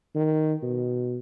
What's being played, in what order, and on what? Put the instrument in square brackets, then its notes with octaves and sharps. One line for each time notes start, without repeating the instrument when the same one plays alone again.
[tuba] D#3
B2